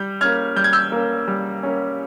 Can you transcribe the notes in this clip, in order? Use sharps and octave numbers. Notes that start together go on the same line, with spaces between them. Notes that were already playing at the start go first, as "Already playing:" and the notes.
Already playing: G3 G6
A#3 C#4 F6 G#6
G3 G6
G#6
E6 G6
A#3 C#4
G3
A#3 C#4